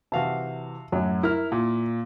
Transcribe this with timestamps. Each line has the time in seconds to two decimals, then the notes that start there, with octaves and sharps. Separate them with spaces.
0.12 C3 E3 F#4 F5 A5
0.92 F#2 A2 F#3
1.23 E4 A#4 F6
1.52 A#2